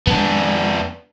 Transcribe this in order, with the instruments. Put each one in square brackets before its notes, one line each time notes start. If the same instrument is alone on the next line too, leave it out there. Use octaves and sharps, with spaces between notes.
[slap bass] F2 G#3 [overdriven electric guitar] B3 D4